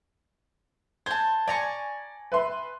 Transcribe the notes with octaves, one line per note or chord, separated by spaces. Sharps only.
C5 A5 G#6
D5 G#5 A#5 C#6
B4 E5 C6